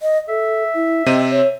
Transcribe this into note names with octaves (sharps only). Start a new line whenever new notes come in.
D#5
A4 E5
E4
C3 C4 D#5 D#7
C#5